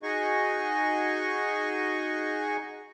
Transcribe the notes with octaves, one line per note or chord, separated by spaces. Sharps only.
D#4 F#4 G#4 D#5 G#5 C#6